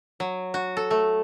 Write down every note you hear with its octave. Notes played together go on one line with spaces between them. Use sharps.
F#3
F#4
A4
A3